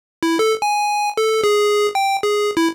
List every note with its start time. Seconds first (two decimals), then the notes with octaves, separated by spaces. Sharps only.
0.23 E4
0.39 A4
0.62 G#5
1.17 A4
1.44 G#4
1.95 G5
2.23 G#4
2.57 E4